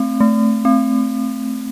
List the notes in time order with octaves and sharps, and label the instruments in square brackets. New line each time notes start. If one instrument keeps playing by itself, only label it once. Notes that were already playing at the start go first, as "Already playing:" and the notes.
Already playing: [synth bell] A3 C4
A3
C4